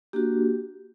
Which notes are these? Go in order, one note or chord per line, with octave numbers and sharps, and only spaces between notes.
A#3 D4 F#4 G4